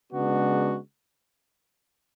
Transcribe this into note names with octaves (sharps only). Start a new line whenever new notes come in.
C#3 G#3 B3 D4 F#4